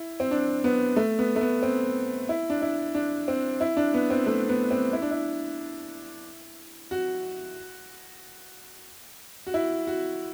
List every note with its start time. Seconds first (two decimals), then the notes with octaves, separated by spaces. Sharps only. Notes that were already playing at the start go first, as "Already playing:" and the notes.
Already playing: E4
0.20 C4
0.31 D4
0.64 B3
0.96 A3
1.19 B3
1.36 A3
1.41 B3
1.62 C4
2.29 E4
2.50 D4
2.62 E4
2.95 D4
3.28 C4
3.61 E4
3.77 D4
3.94 B3
4.10 C4
4.26 A3
4.49 B3
4.71 C4
4.93 E4
5.02 D4
5.11 E4
6.91 F#4
9.47 F#4
9.54 E4
9.87 F#4